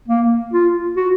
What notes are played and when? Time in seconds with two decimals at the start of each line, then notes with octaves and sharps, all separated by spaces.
0.08 A#3
0.53 F4
0.96 F#4